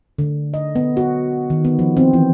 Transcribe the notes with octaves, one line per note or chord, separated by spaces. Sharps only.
D3
D#5
B3
F#4
D#3
B3
F3
C4
E3